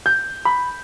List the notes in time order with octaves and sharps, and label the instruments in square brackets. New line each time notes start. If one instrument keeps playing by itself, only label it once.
[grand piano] G6
B5